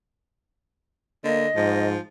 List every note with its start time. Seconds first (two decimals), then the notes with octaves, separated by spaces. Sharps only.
1.24 D3 A#3 D#5
1.56 G#2 F3